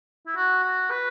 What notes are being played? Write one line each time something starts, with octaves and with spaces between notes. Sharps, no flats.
E4
F#4
F#4
B4